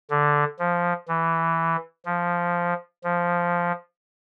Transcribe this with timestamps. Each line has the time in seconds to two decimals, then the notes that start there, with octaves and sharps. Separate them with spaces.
0.10 D3
0.59 F3
1.08 E3
2.05 F3
3.04 F3